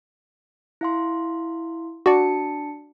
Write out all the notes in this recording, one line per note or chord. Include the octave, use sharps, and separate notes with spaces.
E4 F5 C6
D4 F#4 D5 A5 C#7